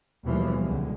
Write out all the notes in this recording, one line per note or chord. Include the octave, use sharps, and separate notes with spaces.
D#2 B2 E3 F3 G3 A3
C#2 D3 G#3